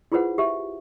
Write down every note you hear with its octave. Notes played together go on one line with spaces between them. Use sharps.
E4 F4 G#4 B4 C5 F#5
G4 E5